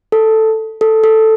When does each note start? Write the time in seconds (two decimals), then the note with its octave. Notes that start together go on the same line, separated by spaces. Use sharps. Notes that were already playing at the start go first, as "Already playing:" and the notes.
0.12 A4
0.81 A4
1.04 A4